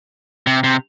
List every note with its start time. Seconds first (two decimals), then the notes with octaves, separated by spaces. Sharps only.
0.47 C3
0.64 C3